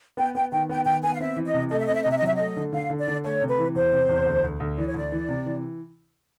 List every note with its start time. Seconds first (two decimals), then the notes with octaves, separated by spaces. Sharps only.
0.17 B3 G5
0.34 B3 G5
0.51 D#3 G5
0.69 B3 G5
0.85 D#3 G5
1.03 B3 G#5
1.14 F5
1.20 C4 E5
1.36 E3
1.46 D#5
1.54 C3
1.71 A3 D#5
1.79 E5
1.86 C4 D#5
1.95 E5
2.02 D#5
2.05 C3 E5
2.18 D#5
2.22 F#3 E5
2.35 A3 D#5
2.56 D3
2.73 D3 F5
2.90 D3
2.99 D5
3.08 D3
3.24 A3 C#5
3.42 C3
3.49 B4
3.59 E3
3.75 E2 C5
3.92 C3
4.09 E2
4.26 D2
4.44 D2
4.60 D2
4.78 E3 D5
4.87 C#5
4.94 D2 D5
5.12 E3
5.29 C3
5.46 E3